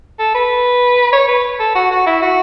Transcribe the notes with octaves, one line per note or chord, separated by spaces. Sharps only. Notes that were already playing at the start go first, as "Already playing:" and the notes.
A4
B4
C#5
B4
A4
F#4
F#4
E4
F#4